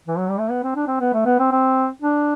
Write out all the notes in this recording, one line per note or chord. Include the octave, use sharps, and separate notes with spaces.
E3
F#3
G3
A3
B3
C4
D4
C4
B3
A3
B3
C4
C4
D4